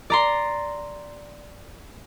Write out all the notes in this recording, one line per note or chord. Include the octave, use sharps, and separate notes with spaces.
D5 A#5 C6